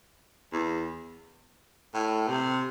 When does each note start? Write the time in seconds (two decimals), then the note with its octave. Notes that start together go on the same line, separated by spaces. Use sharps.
0.53 E2
1.94 A2
2.28 C3